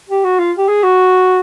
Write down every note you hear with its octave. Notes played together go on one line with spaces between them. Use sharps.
G4
F#4
F4
G4
G#4
F#4